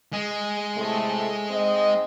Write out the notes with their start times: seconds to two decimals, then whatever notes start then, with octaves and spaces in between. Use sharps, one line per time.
0.13 G#3
0.75 A2 C3 A3
1.51 G#2 C4 D#5